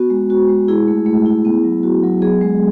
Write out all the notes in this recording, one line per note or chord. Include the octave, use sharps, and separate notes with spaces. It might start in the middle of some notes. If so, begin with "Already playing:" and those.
Already playing: B3 F#4
G#3
F#4
G#3
E4 G#4
A3
A3
E4
B3
F#3
F#4
F#3
B3 G#4
G#3